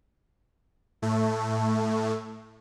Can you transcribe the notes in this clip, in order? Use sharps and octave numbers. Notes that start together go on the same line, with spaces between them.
A2 A3